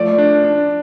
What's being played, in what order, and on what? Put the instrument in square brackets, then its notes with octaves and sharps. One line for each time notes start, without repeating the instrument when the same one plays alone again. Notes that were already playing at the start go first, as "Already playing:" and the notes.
Already playing: [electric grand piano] F3 A3 [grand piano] D5
[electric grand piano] D4
D4